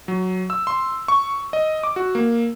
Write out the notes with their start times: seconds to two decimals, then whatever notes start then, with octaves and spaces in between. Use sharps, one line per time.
0.08 F#3
0.50 E6
0.67 C6
1.08 C#6
1.53 D#5
1.83 D6
1.96 F#4
2.15 A#3